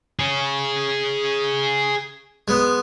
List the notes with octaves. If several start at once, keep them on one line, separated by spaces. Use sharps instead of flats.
G#4 C#5
G#3 B3